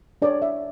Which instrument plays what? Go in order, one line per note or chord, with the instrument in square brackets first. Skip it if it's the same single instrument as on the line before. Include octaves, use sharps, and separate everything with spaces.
[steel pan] D4 A4 C#5 D5
E5